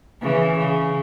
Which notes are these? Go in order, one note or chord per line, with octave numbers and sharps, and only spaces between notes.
C#3 E3
C#3